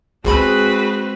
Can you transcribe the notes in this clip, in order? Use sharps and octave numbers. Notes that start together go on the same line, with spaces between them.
G1 C#2 G#3 C4 F#4 G#4 B4 B5